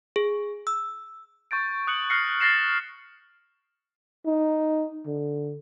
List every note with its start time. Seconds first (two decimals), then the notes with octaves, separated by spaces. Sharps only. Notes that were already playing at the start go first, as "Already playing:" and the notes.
0.16 G#4
0.67 E6
1.51 C#6 G6 A6 D7
1.87 D#6 F#6 C#7 F#7
2.10 F6 F#6 A#6 C7 C#7
2.41 F6 A6 A#6 C7 E7
4.26 D#4
5.06 D3